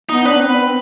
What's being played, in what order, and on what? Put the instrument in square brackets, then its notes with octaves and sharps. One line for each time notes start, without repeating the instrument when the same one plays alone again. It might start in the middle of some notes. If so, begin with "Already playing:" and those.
[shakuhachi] B3 [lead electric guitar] D#4
[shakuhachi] D4 [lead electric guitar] B4
[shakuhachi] C4
B3
C4